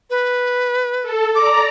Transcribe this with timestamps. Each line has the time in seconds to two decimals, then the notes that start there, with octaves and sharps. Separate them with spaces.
0.10 B4
1.02 A4
1.35 D5 A#5 D6